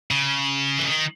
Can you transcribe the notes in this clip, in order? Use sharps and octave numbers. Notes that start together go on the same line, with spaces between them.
C#3
E3
D#3